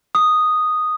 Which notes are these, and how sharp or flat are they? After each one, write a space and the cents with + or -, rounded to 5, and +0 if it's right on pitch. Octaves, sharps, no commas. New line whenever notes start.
D#6 -5